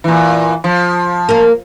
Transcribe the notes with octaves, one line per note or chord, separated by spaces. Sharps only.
A#2 E3
F3
A#3 A#4